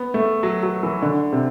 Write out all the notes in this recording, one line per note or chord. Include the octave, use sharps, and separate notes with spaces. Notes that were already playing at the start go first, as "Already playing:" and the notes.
Already playing: B3
A3
F#3
F#3
E3
D3
C3